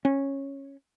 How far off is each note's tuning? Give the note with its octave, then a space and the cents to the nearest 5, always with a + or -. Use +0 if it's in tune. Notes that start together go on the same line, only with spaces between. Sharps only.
C#4 -10